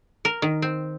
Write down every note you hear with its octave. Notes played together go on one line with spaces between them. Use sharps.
A#4
D#3
C4